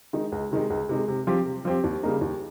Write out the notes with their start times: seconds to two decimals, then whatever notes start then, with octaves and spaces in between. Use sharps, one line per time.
0.13 D#3 G#3 D#4
0.32 C#2
0.51 C3 D#3 G#3
0.70 C#2
0.89 C3 D#3 G#3
1.08 C3
1.27 F3 C4 G4
1.46 C3
1.65 F3 C4 G4
1.84 D#2
2.03 C#3 G3 A#3 D#4
2.21 D#2